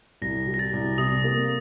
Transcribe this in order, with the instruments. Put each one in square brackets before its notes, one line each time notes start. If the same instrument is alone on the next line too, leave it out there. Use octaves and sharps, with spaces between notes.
[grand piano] C2 [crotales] A#6
[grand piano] F#3
[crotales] A#6
A6
[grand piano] C2
[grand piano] C3 [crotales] D#6
[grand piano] A#3